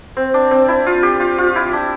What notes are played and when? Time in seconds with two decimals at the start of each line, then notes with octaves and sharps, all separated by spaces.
0.17 C4
0.34 D4
0.51 C4
0.68 E4
0.86 F4
1.03 G4
1.20 F4
1.38 F4
1.56 E4
1.73 D4